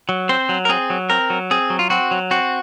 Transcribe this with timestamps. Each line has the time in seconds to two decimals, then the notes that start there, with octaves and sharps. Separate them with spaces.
0.09 F#3
0.29 C4 C5
0.49 F#3
0.65 A#4
0.69 C4 G#4
0.90 F#3
1.10 C4 A#4
1.30 F#3
1.51 C4 G#4
1.70 F#3
1.79 F4
1.90 C4 F#4
2.11 F#3
2.31 C4 F#4